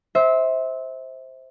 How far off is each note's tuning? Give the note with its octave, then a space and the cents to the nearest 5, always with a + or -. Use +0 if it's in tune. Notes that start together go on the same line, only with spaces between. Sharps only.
C5 +5 E5 -25